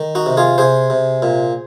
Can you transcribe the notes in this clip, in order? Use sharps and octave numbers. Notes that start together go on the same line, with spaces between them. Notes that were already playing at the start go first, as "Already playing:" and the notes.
Already playing: D#3
D#4 F#4
C3
F4 G#4
C3 G#4 C5
C3
A#2